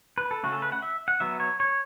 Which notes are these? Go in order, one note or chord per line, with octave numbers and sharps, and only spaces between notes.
B4
A4
C#3 A3 C#4 F#4
A4
B4
F#5
E5
F#5
F#3 B3 E5
C#5
C#5